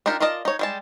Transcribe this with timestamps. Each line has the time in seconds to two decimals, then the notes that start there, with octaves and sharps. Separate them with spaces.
0.06 D4 D#4 F4 G4 A#4
0.20 F4 A#4 D5 D#5 A5
0.45 D#4 C#5
0.59 G3 G#3 A5